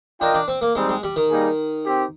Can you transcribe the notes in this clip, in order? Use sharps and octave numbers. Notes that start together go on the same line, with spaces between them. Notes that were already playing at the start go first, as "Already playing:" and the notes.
D4 F4 A#4 D#5 G5
D4
C4
A#3
G3 G#3 C4 D#4
G#3
G3
D#3
G3 A#3 D#4 G#4
C4 G4